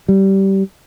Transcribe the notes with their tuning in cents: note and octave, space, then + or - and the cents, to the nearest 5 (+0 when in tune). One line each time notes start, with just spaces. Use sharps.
G3 -20